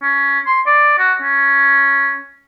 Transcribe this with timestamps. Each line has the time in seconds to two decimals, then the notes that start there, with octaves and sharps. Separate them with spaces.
0.03 C#4
0.47 C6
0.66 D5
0.99 F#4
1.22 C#4